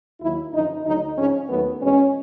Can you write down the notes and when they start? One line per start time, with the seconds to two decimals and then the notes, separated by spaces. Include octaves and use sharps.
0.21 D#2 D#3 F#3 A#3 E4
0.54 F#2 D3 F3 D#4
0.85 D2 D3 F#3 D#4
1.17 G#2 F3 G#3 C#4
1.49 D#2 D#3 F#3 A3 B3
1.82 E2 B2 G#3 C#4